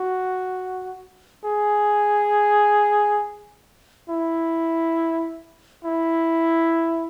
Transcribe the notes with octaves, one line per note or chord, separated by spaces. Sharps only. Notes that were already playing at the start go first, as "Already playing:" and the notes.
Already playing: F#4
G#4
E4
E4